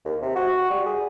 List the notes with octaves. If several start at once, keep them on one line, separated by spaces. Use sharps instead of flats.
D#2
C3
F#4
G3
G#4